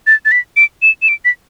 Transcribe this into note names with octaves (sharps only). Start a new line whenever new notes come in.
A6
A6
B6
D7
E7
E7
D7
B6